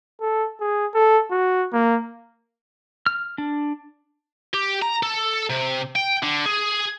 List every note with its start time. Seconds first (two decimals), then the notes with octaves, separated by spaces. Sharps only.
0.21 A4
0.60 G#4
0.94 A4
1.31 F#4
1.72 A#3
3.06 F6
3.38 D4
4.54 G4
4.82 A#5
5.03 A4
5.50 C3
5.96 G5
6.23 D3
6.46 G#4